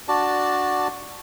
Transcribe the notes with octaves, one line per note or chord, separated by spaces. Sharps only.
D4 F#4 D5 A5